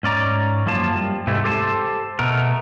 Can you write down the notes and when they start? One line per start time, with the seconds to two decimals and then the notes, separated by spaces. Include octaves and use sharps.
0.03 G#2 C#4 D5 A#5
0.66 F#2 F3 A#3 F4 A5
0.95 G3
1.27 G#2 C3 E3 A3 E4
1.44 G4 A4 C5 G#5 A5
2.19 B2 A3 B3 A#4